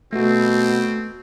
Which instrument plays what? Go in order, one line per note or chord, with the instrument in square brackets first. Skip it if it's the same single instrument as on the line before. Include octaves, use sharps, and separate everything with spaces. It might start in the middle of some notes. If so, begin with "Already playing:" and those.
[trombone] B2 [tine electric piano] A3 F#4 [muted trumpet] C4